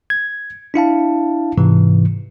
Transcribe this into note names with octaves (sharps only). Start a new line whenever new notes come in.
G#6
D4 E4 F5 A5
G#2 C3 E3